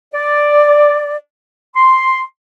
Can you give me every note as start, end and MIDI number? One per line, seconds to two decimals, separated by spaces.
0.14 1.17 74
1.76 2.21 84